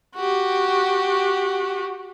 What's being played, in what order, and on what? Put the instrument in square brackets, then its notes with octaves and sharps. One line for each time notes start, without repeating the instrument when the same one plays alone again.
[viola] F#4 G4